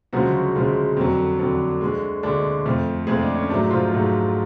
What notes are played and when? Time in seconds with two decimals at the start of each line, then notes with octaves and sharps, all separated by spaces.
0.13 D2 C#3 F3 F#3 G#3 F#4
0.55 D2 C#3 F3 G#3
0.97 F2 D3 F#3
1.39 F2 D3 F#3 D4
1.81 D2 D3 G#3
2.23 D2 D3 G#3 D4
2.66 F2 F3 A3
3.07 F2 F3 G#3 A3 G#4
3.21 D4
3.36 C#4
3.50 G#2 F#3 A3 D4
3.71 F3 F4
3.92 G#2 F#3 A3